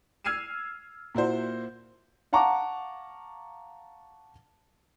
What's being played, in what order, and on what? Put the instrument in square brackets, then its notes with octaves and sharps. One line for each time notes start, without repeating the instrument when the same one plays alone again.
[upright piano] E6 F6 G#6 C7 D#7 E7
A#2 E4 F#4 C5
[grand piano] F5 F#5 A5 A#5 C#6 D6